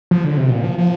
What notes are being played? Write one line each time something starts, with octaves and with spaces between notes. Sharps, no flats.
F3
D3
C3
A#2
F3
F3